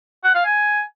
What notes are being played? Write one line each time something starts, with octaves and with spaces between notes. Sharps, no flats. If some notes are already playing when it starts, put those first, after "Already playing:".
F#5
F5
G#5